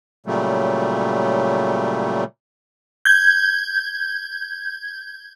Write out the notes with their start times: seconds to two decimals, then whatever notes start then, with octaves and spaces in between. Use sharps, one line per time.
0.26 A#2 C#3 F#3 G3 A3
3.05 G6 G#6